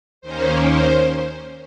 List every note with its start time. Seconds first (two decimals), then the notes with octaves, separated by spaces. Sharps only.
0.21 D#2 D#3 A#3 C#4 C5
0.63 C5